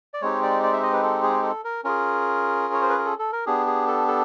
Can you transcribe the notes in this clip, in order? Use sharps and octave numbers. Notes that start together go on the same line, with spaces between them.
D5
G#3 C4 D#4 G4 C#5
D5
D5
E5
D#5
B4
A4
G#4
A4
A#4
C#4 F4 G#4 A#4
C#5
C5
B4
A#4
A4
A4
A#4
B3 D4 G4 G#4
G#4
A4
A4